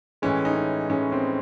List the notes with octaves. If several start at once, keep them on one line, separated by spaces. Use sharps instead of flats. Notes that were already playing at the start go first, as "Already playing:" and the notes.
A2 E3 G#3 C#4
D#4
C#4
A2 E3 G#3 C#4
C4